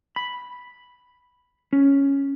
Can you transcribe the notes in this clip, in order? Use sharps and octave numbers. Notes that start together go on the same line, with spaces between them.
B5
C#4